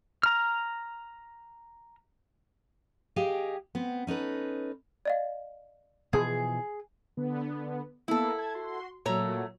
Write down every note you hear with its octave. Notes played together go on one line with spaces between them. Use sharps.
A#5 F6
G4 G#4 D#5 F5 G5
B3 C4
C#4 D#4 A4 B4
D5 D#5 F5
B2 E3 F3 G#4 G#6
D3 B3
A#3 B3 E4 A4
A5 G#6
F#4 C6
A#2 F#3 A3 C#5 A#5